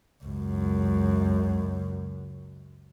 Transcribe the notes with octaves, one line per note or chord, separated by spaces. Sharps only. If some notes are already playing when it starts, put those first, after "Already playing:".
C#2 F#2